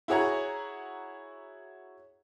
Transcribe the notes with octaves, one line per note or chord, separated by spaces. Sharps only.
E4 F#4 G#4 C#5 F#5 A#5